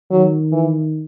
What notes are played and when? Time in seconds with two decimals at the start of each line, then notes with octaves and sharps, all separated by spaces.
0.11 D#3 F#3
0.52 E3